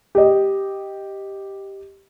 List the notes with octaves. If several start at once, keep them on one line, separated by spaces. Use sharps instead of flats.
G4 D#5